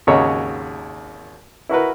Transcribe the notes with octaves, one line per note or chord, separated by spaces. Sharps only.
G#1 D#2 C#3 F#4 C#5 A#5
E4 F#4 A#4 B4